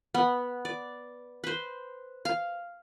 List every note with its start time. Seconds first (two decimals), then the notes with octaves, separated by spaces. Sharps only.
0.14 B3
0.65 D5
1.44 B4 C5
2.25 F5